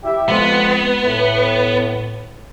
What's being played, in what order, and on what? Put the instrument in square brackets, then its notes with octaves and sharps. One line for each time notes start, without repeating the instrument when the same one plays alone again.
[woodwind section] E4 G4 E5
[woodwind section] F2 G#3 [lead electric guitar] B3
[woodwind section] A2